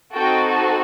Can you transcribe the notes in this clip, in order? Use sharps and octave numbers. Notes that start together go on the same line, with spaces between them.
C4 D#4 F#4 A4 G5